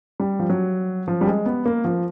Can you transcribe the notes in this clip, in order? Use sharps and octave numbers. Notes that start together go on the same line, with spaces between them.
G3
F3
F#3
F3
G3
G#3
B3
A#3
F3